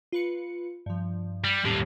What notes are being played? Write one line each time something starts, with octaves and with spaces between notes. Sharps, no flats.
F4 B4 C#7
G2 F3
G3
D#2 A2 G3 C#4 G4